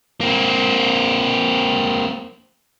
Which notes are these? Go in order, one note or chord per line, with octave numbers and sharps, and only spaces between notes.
A#3 C4